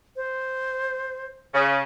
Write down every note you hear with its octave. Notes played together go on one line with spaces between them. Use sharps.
C5
C#3